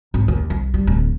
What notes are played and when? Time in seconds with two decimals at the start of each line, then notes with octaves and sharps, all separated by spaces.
0.14 G#1
0.28 D#2
0.50 C2
0.74 G3
0.87 D1